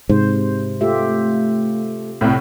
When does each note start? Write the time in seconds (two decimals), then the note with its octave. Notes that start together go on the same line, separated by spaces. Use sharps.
0.10 G#2 C3 C5
0.81 A3 F4 G4 E5
2.21 C2 A2